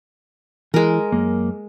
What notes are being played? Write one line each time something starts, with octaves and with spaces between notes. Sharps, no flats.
E3 G#3 A#4
F#2 A#3